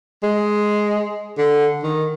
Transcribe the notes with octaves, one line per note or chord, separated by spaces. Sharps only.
G#3
D3
D#3